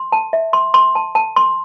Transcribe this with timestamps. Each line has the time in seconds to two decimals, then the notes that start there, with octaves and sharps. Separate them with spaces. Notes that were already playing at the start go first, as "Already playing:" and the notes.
Already playing: C6
0.12 A5
0.33 E5
0.53 C6
0.74 C6
0.95 A5
1.15 A5
1.36 C6